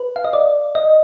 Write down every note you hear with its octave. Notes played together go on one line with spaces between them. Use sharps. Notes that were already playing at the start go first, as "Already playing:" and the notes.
Already playing: B4
F5
D#5
D5
D#5